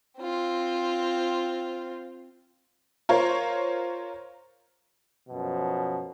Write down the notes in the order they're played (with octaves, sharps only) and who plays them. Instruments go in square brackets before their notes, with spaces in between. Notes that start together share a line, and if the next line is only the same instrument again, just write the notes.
[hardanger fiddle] C4 F4
[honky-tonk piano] F4 A#4 C5 C#5
[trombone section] F#2 B2 F3